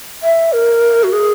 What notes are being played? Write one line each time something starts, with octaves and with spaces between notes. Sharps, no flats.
E5
A#4
F#4
G#4